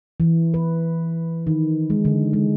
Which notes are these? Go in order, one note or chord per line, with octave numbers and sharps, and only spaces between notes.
E3
B4
D#3
G#3
D3
G#3